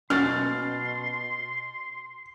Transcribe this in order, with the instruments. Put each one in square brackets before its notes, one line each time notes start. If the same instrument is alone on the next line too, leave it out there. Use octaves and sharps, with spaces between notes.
[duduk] B2 [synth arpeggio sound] F#3 A#3 C#4 [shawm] C6 [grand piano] F6 A6